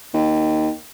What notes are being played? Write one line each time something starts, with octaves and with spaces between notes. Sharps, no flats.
D#2